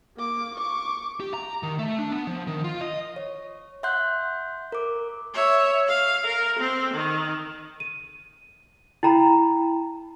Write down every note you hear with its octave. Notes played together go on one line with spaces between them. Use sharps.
A#3 D6
C#6 D6
G4
A#5
D#3
A3
D4
B3
F3
D#3
F4
D#5
C#5
E5 F#5 C6 F#6 G6
A#4 D6
C#5 E5
F5
A#4
C4
D#3
D#7
E4 G5 A#5 B5